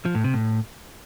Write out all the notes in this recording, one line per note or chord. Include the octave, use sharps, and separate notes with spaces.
F3
A2
C3
A2